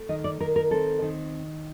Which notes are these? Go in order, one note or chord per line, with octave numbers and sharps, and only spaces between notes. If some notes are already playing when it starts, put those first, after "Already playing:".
Already playing: A3
D#3 D#5
D5
D#3 A#4
A#4
C4 A4
D#3